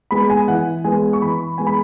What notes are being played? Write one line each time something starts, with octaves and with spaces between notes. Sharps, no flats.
G#3 B3 B5
G#5
E3 F#5
G#3 B3 G#5
C#6
E3 B5
G#3 B3 G#5
B5